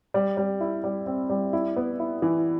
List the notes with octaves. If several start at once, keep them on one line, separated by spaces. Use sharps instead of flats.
G3
G3
E4
G3
C4
G3
E4
B3
E4
E3